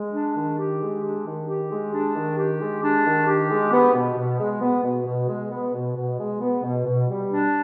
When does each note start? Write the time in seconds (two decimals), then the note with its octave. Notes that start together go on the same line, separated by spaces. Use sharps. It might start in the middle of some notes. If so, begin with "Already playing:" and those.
Already playing: G#3
0.13 D4
0.35 D#3
0.58 G4
0.80 G#3
1.03 D4
1.25 D#3
1.48 G4
1.70 G#3
1.93 D4
2.15 D#3
2.37 G4
2.60 G#3
2.82 D4
3.04 D#3
3.27 G4
3.50 G#3
3.72 B3
3.94 B2
4.17 B2
4.40 G#3
4.61 B3
4.84 B2
5.06 B2
5.29 G#3
5.52 B3
5.74 B2
5.96 B2
6.19 G#3
6.41 B3
6.63 B2
6.86 B2
7.08 G3
7.31 D4